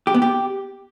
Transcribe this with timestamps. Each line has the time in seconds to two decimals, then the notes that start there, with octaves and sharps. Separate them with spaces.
0.07 G4
0.14 B3
0.22 G4